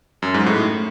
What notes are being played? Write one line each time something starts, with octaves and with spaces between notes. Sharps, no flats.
F#2
G#2
A2